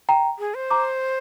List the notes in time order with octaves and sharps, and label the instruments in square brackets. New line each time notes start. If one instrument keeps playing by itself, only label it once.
[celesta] G5 A#5
[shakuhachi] G#4
C5
[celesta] A#5 D6